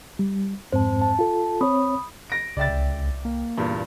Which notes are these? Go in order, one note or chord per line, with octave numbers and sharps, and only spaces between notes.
G3
F2 G#2 C4 C5 A5
A5
F4 A4
C4 C#5 B5 D#6
A#6 D7
C2 C#3 D5 E5 G5 A6
C#2
A#3
E2 G2 A#2